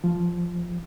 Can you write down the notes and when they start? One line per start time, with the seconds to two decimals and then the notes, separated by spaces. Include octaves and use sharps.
0.04 F3